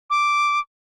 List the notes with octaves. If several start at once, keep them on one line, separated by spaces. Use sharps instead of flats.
D6